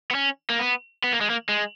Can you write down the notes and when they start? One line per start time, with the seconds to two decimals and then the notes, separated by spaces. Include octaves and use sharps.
0.11 B3
0.15 C#4
0.50 A#3
0.59 B3
1.04 B3
1.13 A#3
1.21 G#3
1.30 A#3
1.49 G#3